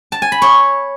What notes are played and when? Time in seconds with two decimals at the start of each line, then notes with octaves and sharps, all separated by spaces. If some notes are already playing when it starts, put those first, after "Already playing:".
0.12 A5
0.22 G#5
0.32 B5
0.42 C#5